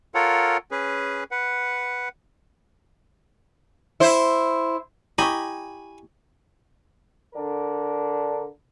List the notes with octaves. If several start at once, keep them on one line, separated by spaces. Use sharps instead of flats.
F4 A4 A#4 C#5 F#5
C#4 G#4 B4
B4 F#5
E4 C5
E4 G4 D#5 G#5 B5 C#6
D3 D4 A#4